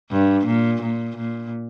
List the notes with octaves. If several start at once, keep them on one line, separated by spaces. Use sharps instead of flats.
G2
A#2
A#2
A#2